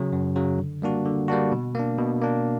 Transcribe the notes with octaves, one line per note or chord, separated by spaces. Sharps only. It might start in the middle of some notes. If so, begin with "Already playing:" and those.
Already playing: C#3 F#3
F#2
C#3 F#3
D3
G3 A#3 D4 F#4
D3
G3 A#3 D4 F#4
B2
A#3 D4
B2
A#3 D4